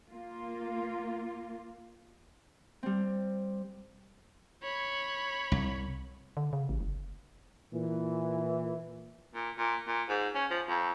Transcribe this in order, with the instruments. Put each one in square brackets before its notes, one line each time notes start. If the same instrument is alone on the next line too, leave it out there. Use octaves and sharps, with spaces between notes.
[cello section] A#3 F4
[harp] G3 C4
[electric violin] C#5 B5
[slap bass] C2
[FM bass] D3
C#3
A1
F#1
[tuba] A#2 [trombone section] E3
[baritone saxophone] A#2
A#2
A#2
G#2
C#4
F3
F2